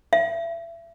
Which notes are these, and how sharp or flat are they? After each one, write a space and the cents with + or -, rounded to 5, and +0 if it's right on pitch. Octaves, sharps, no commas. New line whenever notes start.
E5 +30